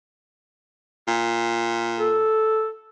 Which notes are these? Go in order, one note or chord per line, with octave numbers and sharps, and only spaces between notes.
A#2
A4